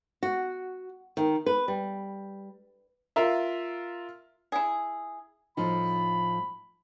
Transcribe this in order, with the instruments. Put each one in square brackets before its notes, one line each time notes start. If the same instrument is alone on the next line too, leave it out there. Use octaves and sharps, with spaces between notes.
[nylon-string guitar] F#4
D#3
B4
G3
[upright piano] F4 A#4 E5
[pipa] E4 G#4
[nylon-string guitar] A2 F3 D#4 [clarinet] B5